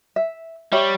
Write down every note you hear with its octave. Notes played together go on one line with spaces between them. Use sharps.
E5
G3 G4 C#5 E5